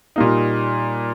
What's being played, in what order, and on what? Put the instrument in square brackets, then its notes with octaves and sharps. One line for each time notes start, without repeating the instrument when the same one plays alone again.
[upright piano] A#2 G3 A#3 D#4